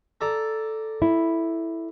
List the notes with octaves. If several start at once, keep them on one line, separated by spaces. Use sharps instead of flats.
A4 D5 A#5
E4